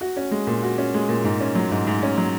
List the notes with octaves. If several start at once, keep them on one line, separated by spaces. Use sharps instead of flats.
F#4
C#4
G#3
A#2
F#4
C#4
G#3
A#2
G#2
C#4
F#3
G#2
G#2
C#4
F#3